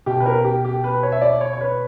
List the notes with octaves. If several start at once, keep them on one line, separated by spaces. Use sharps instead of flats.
B2 G4
B4
A#4
G4
G4
B4
C#5
E5
D5
C#5
C#5
B4